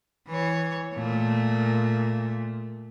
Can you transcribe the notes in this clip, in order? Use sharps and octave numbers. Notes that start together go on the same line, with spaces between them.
E3 C#5
A#2 A3